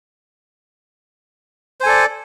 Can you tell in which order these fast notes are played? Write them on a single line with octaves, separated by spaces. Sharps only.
C5 G#5 A4 D5